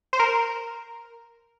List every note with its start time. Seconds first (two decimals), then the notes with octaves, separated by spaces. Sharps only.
0.13 C5
0.19 A#4